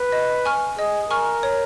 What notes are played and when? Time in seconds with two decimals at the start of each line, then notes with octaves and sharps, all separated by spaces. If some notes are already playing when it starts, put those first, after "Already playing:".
Already playing: B4
0.12 D#5
0.45 G#5 C#6 F6
0.78 G#4 D#5
1.10 A#4 G#5 C#6 F6
1.43 C#5